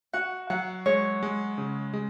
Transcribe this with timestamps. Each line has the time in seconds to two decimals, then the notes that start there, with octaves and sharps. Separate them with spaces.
0.13 F#4 F#5
0.50 F#3 F#5
0.86 G#3 C#5
1.23 G#3
1.58 C#3
1.93 G#3